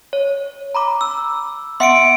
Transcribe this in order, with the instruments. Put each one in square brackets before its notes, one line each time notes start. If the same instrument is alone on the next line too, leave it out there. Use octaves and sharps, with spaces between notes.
[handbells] C#5
A#5 B5 D6
[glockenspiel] E6
[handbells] B3 E5 F#5 [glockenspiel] C6 C#7 D7